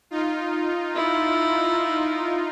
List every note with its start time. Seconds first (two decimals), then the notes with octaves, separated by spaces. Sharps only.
0.11 D#4 F4
0.95 E4